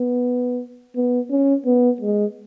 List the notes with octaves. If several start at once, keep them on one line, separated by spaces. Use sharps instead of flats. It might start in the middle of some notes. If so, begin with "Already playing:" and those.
Already playing: B3
B3
C#4
B3
G#3